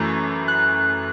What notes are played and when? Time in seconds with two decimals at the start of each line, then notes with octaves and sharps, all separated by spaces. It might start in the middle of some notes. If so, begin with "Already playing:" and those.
Already playing: F#2 E3 A3
0.48 F#6